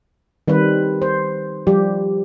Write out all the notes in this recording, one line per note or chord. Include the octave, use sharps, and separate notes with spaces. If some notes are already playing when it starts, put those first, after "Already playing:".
D#3 G3 C4 B4
C5
F3 G3 G4